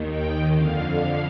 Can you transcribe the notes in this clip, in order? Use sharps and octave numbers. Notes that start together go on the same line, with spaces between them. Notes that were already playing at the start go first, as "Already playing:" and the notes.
Already playing: D#2 D#3
G5
F2 D3 F5